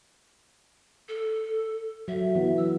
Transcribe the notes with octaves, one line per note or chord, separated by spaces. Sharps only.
A4
F#3 E5
E3 B3
E6